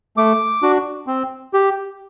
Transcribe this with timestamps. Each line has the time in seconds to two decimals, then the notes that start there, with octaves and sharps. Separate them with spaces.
0.17 A3 D6
0.62 D4 F#4
1.07 C4
1.54 G4